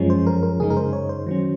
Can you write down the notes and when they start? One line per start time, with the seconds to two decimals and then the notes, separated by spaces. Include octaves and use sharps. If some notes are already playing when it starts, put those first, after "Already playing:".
Already playing: F#2 F3 G#3 C#4
0.10 C5
0.27 A#4
0.43 A#4
0.60 F#2 C#3 G#3 D#4 G#4
0.70 A#4
0.77 C5
0.93 C#5
1.09 C5
1.27 D#3 F#3 C#4